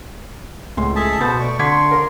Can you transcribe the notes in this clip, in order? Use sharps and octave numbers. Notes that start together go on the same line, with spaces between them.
C#2 A2 C6
G#4 A4 E5 A5
B2 B3 C5 A6
A3 D5 C#6
D3 C6 D6 G#6 B6
F4 A#4